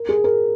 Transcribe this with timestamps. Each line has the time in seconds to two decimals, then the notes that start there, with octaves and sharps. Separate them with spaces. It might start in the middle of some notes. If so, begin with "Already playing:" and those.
Already playing: A#4
0.09 G#4
0.24 A#4